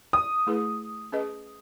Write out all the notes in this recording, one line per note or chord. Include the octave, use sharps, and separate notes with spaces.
D#6
A3 E4 G#4 B4
C#4 G#4 B4 D#5